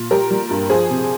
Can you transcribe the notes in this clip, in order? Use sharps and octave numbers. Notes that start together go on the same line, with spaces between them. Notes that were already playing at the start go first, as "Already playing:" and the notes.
Already playing: A#2
G3 G4 A#4
G3
G2
F3 G#4 C5
C3